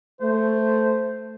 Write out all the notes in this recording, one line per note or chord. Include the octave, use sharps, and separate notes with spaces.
A3 C5